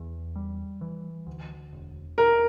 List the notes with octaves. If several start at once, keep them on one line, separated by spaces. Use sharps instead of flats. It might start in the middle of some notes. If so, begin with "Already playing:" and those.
Already playing: E2
G3
E3
D2
E1
E1 A#4